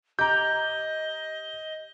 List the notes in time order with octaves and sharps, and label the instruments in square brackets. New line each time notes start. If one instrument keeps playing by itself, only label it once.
[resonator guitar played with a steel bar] G4 A#5 [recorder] D#5 [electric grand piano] G6